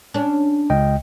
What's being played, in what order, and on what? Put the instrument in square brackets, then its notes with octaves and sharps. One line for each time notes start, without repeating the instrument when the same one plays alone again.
[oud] C#4 D4
[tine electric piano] C#2 D#5 G5